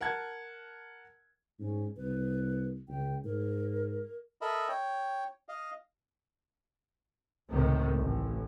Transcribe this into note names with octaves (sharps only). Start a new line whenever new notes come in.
A#4 F#5 A5 G#6
G#2 C#4
C2 B4
C#2 G5
G#2 A#4
A4 A#4 D#5 E5 B5
C#5 G5
D#5 F5
C#2 A2 C3 D#3 A3
A1